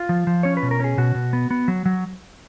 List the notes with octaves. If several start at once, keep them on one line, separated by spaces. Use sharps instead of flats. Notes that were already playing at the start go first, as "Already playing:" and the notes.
Already playing: F4
F3
F3
C#4 C#5
B4
B2
A#4
C#4 G#4
B2 F#4
B2
B3
B3
F#3
F#3